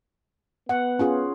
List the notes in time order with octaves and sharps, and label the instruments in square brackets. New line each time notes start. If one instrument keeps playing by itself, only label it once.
[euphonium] B3 [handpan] F#5
[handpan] C#4 F4 G#4